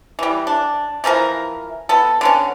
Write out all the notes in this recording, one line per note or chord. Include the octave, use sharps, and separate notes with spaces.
E3 G3
D4
E3 F3 A4 A#4
B3 A4
D3 B3 C#4